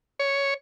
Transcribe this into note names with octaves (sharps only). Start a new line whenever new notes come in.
C#5